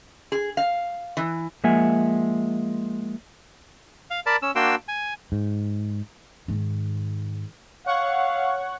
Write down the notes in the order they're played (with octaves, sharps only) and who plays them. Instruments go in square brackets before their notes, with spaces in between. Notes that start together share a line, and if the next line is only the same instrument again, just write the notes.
[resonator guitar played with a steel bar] G#4
F5
E3
[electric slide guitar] F3 G#3 A#3 E5 F#5 G#5
[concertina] F5
A#4 D5 A5 B5
C#4 E6
A#3 D4 F#4 G5 C6 E6
G#5
[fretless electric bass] G#2
[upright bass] G#2 D#3
[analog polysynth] C#5 F#5 C#6 [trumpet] F5